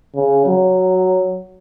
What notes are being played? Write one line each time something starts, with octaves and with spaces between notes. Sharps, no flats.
C#3
F#3